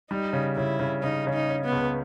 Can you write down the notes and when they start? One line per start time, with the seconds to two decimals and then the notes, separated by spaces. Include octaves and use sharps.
0.10 G3 D#4
0.33 C#3
0.56 C#3 E4
0.80 C#3
1.03 C#3 D#4
1.27 C#3
1.34 D#4
1.49 C#4
1.65 B3
1.72 C#2